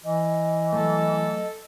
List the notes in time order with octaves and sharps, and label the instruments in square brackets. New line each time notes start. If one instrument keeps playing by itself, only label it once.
[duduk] E3 [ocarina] D#5
[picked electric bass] F#3 A3 [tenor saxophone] A4